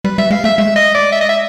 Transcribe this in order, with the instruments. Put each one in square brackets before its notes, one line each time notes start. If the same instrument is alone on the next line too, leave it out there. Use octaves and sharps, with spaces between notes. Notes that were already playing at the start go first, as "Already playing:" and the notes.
[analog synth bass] G3 [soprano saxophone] B4
[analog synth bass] G3 [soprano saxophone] E5
[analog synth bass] G#3 [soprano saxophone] F5
[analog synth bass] A3 [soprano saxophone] E5
[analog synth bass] G#3 [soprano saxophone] E5
[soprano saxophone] D#5
D5
E5
D#5
E5